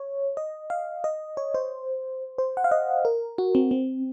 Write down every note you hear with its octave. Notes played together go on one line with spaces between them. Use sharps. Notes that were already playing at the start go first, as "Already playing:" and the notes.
Already playing: C#5
D#5
F5
D#5
C#5
C5
C5
F#5
F5
D#5
A#4
F#4
C4
C4